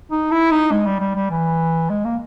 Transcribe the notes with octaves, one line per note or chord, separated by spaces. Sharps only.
D#4
E4
D#4
G#3
G3
G3
G3
E3
G#3
A#3